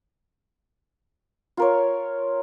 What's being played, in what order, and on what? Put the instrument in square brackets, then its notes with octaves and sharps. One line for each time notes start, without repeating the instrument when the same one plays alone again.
[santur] F4 A#4 C#5